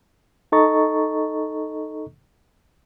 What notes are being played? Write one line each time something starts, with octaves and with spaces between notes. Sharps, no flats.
D#4 A4 D#5 A#5 C#6 A6